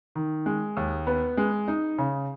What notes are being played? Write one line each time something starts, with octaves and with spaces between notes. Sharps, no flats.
D#3
G#3
D#2
B3
G#3
D#4
C#3